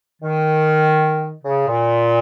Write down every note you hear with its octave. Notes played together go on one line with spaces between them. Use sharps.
D#3
C#3
A#2